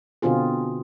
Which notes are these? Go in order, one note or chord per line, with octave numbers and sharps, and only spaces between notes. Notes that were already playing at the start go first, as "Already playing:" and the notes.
B2 D3 C4 F4 G#4